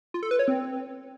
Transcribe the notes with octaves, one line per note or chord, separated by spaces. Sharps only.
F4
A4
B4
C#5
C4